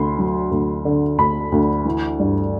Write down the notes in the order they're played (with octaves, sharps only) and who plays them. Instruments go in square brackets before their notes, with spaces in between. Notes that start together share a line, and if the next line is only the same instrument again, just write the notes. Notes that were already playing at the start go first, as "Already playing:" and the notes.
Already playing: [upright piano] D2 D3 B5 C6
F#3
D2
D3
D2 B5
D2
E3
G2